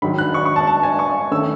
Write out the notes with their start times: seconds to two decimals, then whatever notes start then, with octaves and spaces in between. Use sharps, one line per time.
0.02 G#2 D#3 F#3 B5
0.18 F#6
0.34 C#6
0.45 C#6
0.56 A5
0.67 A5
0.83 G#5
0.99 C#6
1.31 D#3 A3 C#4 E6